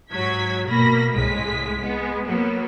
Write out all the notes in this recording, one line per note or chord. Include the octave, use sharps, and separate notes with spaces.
G#2 F#3 G#6 B6
B2 A#3 B5 A#6
C2 A2 G#3 B6
G#3 B3
F#3 A#3 B3